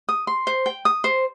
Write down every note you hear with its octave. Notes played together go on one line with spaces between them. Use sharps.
D#6
C6
C5
G5
D#6
C5